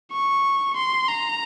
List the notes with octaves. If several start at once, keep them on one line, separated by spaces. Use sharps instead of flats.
C#6
C6
A#5